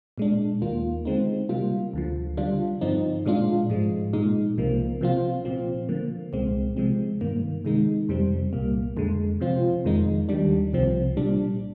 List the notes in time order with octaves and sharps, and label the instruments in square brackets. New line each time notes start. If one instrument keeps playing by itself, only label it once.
[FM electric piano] A#2 G#3 D4
D#2 D#3 A#3 F4
D3 G#3 C4 D#4
C3 G3 A#3 F4
D2 D3 F3
D3 G3 D4 F4
G2 D3 F3 C4 D#4
A#2 G#3 D4 F4
G#2 F3 G#3
A#2 G#3 D#4
C2 C3 F3 A#3
C3 F3 C4 F4
A#2 F3 C4
D3 F3 A#3
C2 A#2 G#3 C4
C3 F3 G#3 C4
G2 D#3 A#3
C3 D#3 G#3 D#4
F2 C3 G3 C4
C2 A#2 G3 A#3
F2 D3 G#3
C3 F3 C4 F4
F2 D#3 G#3 D#4
D#2 D#3 G3 D4
C2 C3 F3 C4
A#2 G3 D4